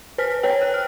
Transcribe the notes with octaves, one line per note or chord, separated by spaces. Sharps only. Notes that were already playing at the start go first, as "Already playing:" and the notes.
B4 C5 F6 B6
B4 C#5 G5
F#6
F6